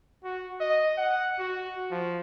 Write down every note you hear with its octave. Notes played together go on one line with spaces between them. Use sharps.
F#4
D#5
F#5
F#4
F3